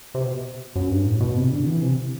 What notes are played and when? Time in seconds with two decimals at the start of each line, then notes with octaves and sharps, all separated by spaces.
0.14 C3
0.25 B2
0.76 F#2
0.90 G2
1.06 A2
1.20 B2
1.36 C3
1.52 D3
1.66 E3
1.82 C3